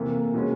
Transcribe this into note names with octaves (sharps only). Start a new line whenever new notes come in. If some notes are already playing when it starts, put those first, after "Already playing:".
Already playing: C3 E3 A3 A#3
B2 G#3 C#4